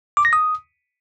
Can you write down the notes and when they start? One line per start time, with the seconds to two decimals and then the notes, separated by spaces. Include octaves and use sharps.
0.17 D6
0.25 A#6
0.33 D#6